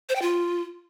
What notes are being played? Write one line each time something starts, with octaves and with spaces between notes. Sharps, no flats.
C5
G5
F4